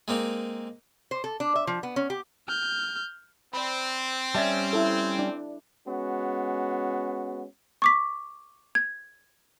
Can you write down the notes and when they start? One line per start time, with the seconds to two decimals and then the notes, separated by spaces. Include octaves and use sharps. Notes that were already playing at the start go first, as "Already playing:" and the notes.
0.08 G#3 A#3 C4 D#4
1.11 C5
1.24 A4
1.40 D4
1.56 E5
1.67 F3
1.83 B3
1.96 C#4
2.10 G4
2.48 F6 G6
3.54 C4 D5 B5
4.35 G3 C#4 D5 E5 A5
4.73 E4 A4
5.19 D4
5.86 G#3 B3 C#4 F#4
7.82 C#6 D6 B6
8.75 G#6